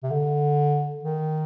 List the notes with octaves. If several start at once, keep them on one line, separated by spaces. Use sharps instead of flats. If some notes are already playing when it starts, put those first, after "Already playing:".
C3
D3
D#3